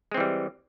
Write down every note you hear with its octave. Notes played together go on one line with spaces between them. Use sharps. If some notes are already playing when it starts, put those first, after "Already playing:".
E3 G3 G#3 C4